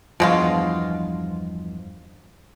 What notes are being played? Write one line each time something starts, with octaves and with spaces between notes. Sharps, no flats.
E2 G2 B2 F3 G#3 F4